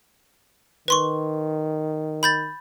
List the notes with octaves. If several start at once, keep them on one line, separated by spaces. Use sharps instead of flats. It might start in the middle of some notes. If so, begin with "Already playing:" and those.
D#3 B4 C6 C#6
B5 G6 A6